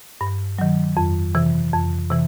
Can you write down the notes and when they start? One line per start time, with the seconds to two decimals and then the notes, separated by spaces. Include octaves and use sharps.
0.21 G2
0.58 D#3 F#3
0.97 F2
1.35 C3 E3
1.73 F2
2.11 C3 E3